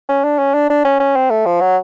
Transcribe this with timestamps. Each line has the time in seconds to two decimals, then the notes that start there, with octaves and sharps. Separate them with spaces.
0.09 C#4
0.24 D4
0.38 C#4
0.54 D4
0.70 D4
0.85 C#4
1.00 C#4
1.16 C4
1.31 A3
1.46 F3
1.61 F#3